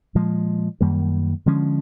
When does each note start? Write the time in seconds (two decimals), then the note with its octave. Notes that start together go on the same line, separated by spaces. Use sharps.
0.15 A#2 F3 G#3
0.81 F#2 D#3 G3 A#3
1.46 D3 F3 G#3 C#4